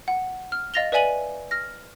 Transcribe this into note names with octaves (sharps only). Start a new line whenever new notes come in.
F#5
F6
D#5 F5 A6 A#6 F7 G7
B4 D5 E5 G#5 D#7 F#7
F6 A#6